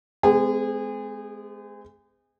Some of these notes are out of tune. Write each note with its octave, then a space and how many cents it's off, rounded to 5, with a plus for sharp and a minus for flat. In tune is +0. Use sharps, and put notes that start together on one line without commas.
G#3 +35 C4 -40 G#4 -30